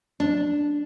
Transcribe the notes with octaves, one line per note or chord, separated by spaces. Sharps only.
D4